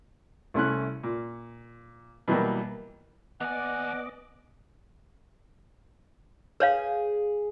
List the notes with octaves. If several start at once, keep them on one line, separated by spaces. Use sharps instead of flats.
C2 A3 C#4 E4 F#6
A#2
B2 E3 F#3 G3 A#3
D#2 B3 D5 D#5 F#5 G#5 D6
G#4 B4 C#5 F5